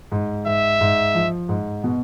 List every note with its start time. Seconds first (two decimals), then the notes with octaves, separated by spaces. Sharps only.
0.12 G#2
0.46 G#2 E5
0.81 G#2
1.15 F3
1.49 G#2
1.84 B2